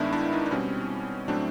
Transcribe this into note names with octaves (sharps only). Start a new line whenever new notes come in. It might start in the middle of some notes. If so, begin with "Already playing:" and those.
Already playing: G2 D#3 G#3 B3 D4 E4
D4
D#4
D4
B2 G3 C4 C#4
A2 F#3 A3 C4 D4